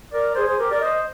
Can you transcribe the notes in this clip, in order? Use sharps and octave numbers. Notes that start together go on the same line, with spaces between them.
A#4 D5
G#4 C5
G#4 C5
G4 A#4
A#4 D5
C5 D#5